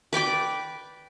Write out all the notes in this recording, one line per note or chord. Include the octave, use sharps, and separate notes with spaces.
B4 D5 G5 D6